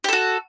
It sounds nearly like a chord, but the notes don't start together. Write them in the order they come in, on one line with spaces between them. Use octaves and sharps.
G4 A4 F#4